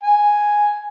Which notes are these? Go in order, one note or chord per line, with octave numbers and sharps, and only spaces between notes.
G#5